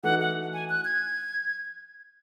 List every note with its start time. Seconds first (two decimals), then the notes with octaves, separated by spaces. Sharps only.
0.03 E3 A3 D#4 F#4 F#5
0.20 F#5
0.53 G#5
0.69 F#6
0.85 G#6